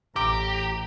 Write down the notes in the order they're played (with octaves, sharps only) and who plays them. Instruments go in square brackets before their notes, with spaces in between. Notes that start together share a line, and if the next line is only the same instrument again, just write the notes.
[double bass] A1 [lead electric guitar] G4 [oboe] A#5 [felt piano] D6